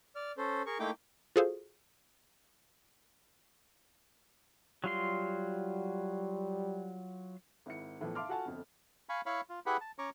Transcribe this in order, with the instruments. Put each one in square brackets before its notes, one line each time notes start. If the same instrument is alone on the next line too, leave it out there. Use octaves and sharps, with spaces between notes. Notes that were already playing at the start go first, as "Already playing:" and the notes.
[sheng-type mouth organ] D5 F6
C#4 A4 C5
G#4 A#4 C#6
A3 A#3 D#4 E4 G5 D6
[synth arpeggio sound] F4 F#4 G#4 A4 C5 F5
[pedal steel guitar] F#3 F4 C6 [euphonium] G3
[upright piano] G#1 E4 C#7
E2 A2 E3 F3
E5 F5 A5 C6 D6 F6
F4 F#4 A4 F#5 G#5 A5
G1 F2
[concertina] F5 G#5 B5 C#6
E4 C#5 F5 B5 C#6
F4
E4 G4 G#4 B4 F#5 B5
A5
C#4 C#5 A#5 C#6 D6